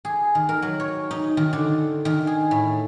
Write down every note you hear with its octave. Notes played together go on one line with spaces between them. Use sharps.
G#4
D#3
A#4
F#3
C#5
D#4
D#3
D3
D#3
G#4
A2